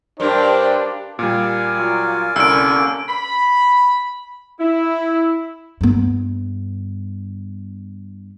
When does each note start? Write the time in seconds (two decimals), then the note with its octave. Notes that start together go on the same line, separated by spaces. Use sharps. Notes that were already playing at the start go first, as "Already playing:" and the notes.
0.20 G2 D4 G4 A#4 C5
1.19 A#2 G3 A#4 D5 G#5
1.77 F#3 F4
2.36 C2 D3 A#3 C#4 E6 D7
3.09 B5
4.60 E4
5.81 G2 B3